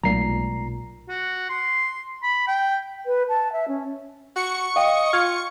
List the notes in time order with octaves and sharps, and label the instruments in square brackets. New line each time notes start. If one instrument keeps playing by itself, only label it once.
[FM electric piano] B1 A#2 [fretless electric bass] F#3 G#3 A3 [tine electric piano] A#5 C7
[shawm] F#4
C6
B5
G5
[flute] B4
A5
E5
C#4
[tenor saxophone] F#4 [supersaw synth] C#6 C#7
[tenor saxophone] D#5 [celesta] F5 G5
[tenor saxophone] F4 [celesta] F6 G#6